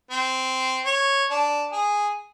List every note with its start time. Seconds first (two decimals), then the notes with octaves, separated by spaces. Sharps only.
0.11 C4
0.86 C#5
1.31 D4
1.72 G#4